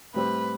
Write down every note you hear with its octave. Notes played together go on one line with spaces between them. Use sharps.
A2 G3 C4 G4 B4